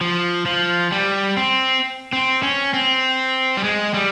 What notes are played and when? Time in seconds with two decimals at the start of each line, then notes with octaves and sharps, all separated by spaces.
0.01 F3
0.46 F3
0.92 G3
1.37 C4
2.13 C4
2.43 C#4
2.74 C4
3.57 G3
3.64 G#3
3.94 G3